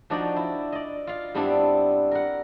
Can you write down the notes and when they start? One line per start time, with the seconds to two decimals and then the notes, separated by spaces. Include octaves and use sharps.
0.10 F3 D4 D#4 F#4 D5
0.36 E4
0.72 D5 D#5
1.07 F4 F5
1.35 G2 G3 B3 C4 D4 E4
2.11 A#4 F#5